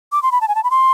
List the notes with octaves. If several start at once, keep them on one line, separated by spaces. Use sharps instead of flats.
D6
C6
B5
A5
G#5
A5
B5
C6